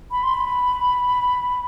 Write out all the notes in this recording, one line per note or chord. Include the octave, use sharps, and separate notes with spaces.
B5
C6
B5